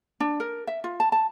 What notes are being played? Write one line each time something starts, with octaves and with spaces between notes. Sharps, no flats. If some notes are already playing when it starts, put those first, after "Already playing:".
D4
A#4
E5
F4
A5
A5